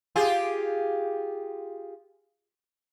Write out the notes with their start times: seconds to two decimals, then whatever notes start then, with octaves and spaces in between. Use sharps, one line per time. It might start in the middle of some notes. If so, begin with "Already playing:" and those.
0.16 F4 G4 G#4